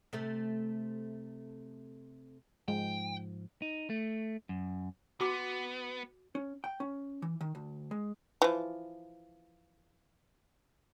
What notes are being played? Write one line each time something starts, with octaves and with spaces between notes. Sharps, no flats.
C3 A3 A4
G#2 F3 G#3 G5
D#4
A3
F#2
B3 F#4 C6 D6
C#4
G5
C#4
E3
D#3
D2
G#3
E3 F3